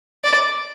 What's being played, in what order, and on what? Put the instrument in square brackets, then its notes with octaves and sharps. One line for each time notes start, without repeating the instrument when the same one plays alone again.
[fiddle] D5